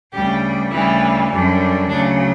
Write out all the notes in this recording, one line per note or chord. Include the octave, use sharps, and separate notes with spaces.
D2 C#3 G3 G4
D2 C#3 E3 G3 E4
F#2 D3 G3
D2 C#3 F#3 D4